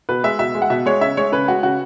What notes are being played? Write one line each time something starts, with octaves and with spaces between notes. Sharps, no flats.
B2 B4
G#3 E5
B2 E5
G#3
F#5
B2 E5
G#3 C#5
C#3 E5
G#3 C#5
C#3 B4
G#3 F#4
C#3 F#4